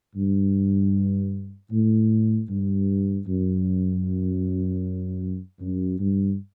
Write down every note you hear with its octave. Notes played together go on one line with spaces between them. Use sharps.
G2
A2
G2
F#2
F#2
G2